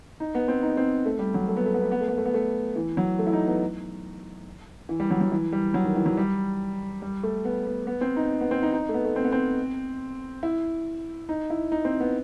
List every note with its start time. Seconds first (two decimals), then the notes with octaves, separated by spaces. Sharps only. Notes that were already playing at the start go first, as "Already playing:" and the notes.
0.20 D#4
0.35 B3
0.48 C4
0.63 D#4
0.77 C4
1.06 A3
1.19 G3
1.34 F#3
1.48 A3
1.57 B3
1.66 A3
1.74 B3
1.82 A3
1.91 B3
2.01 A3
2.08 B3
2.18 A3
2.25 B3
2.34 A3
2.76 E3
2.97 F#3
3.19 A3
3.27 E4
3.33 D#4
3.47 B3
4.89 E3
5.00 G3
5.11 F#3
5.21 F#3
5.32 E3
5.52 G3
5.74 F#3
5.85 D#3
5.96 E3
6.06 F#3
6.17 G3
7.02 G3
7.23 A3
7.45 B3
7.67 B3
7.87 B3
8.01 C4
8.16 D#4
8.41 B3
8.51 C4
8.63 D#4
8.73 D#4
8.89 A3
8.94 B3
9.05 A3
9.16 C4
9.24 B3
9.32 C4
10.43 E4
11.29 D#4
11.50 E4
11.72 D#4
11.85 C4
12.00 B3